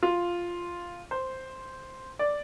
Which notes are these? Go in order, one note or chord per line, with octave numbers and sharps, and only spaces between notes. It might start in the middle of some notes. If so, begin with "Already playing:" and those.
F4
C5
D5